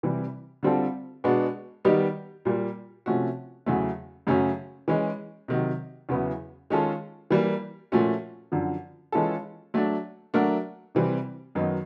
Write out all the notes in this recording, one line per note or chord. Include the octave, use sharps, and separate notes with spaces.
C3 E3 G3
D3 G3 C4 F4 A4
B2 G#3 B3 D4
D#3 G3 B3 D#4 G4
A#2 G3 A#3
C3 F3 A3 C#4 F#4
E2 C#3 F#3 A3
F#2 C#3 F#3 A3 C#4
E3 G#3 C#4
C3 D#3 F#3
E2 C#3 F#3 B3 E4
D#3 G#3 C#4 F4 A4
E3 G3 A#3
A#2 F3 A3 C#4 F#4
F#2 D3 F3
E3 G#3 C#4 F4 A4
F#3 A3 D4
F#3 A3 D4 F#4 A#4
C3 E3 G3 C4
F#2 D#3 F#3 B3 D#4